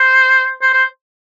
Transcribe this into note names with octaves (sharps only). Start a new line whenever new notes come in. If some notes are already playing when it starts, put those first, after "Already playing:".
Already playing: C5
C5
C5